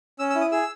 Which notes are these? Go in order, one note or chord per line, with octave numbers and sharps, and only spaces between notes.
C#4 E6
E6
E4
D#6
G#4 E6